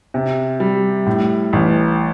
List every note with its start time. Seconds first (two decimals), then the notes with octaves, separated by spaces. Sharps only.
0.14 C3
0.60 G3
1.06 A2
1.53 A1